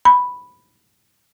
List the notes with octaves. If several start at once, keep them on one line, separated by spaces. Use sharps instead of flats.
B5